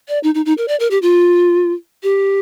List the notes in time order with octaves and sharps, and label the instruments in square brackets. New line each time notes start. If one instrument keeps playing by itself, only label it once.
[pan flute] D5
D#4
D#4
D#4
A#4
D5
A#4
G4
F4
G4